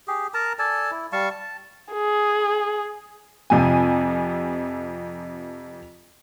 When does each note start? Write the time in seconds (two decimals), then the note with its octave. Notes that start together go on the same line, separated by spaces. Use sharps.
0.08 G4 G#4
0.34 A#4 A5 A#5
0.59 A4 D5 G#5 A5
0.91 E4
1.12 G3 F5 A5 C#6
1.30 A5
1.93 G#4
3.50 F2 C3 F3 G#5